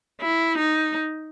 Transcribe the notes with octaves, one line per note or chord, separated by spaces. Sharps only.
E4
D#4